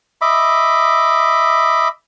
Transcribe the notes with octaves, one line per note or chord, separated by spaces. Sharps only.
D#5 E5 B5 D6